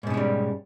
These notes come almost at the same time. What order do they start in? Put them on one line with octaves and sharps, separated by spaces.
G#2 B2 C#4 G#3 G3